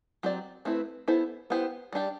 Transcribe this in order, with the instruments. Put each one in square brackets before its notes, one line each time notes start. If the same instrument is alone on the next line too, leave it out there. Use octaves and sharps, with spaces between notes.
[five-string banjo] F#3 C4 G4 D5
A3 C4 E4 B4
B3 E4 A4 C5
B3 E4 G4 C5
G3 D4 G4